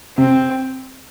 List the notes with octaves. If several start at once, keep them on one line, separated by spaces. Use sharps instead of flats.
C3 C4